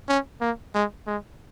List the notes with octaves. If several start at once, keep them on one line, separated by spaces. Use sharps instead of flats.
C#4
A#3
G#3
G#3